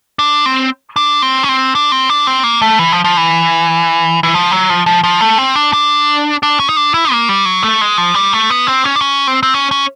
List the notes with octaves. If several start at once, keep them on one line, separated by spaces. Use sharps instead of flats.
D4
C4
D4
C4
C#4
C4
D4
C4
D4
C4
A#3
A3
E3
F3
F3
E3
E3
F3
F#3
F3
F3
F3
A3
C4
D4
D4
D4
C#4
D#4
D4
E4
A#3
G3
F#3
A3
G#3
F3
G3
A3
B3
C4
C#4
D4
C#4
C4
C4
C#4
C#4